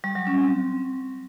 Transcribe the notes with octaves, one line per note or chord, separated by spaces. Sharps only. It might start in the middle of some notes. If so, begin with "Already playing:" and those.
G3
F#3
C#4
C4